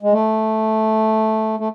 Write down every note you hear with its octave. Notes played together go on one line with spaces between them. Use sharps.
G#3
A3
A3